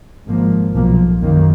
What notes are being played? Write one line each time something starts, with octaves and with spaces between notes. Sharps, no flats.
G#1 G#2 F3 A#3
B1 A#2 F3 A#3
F#2 D#3 A#3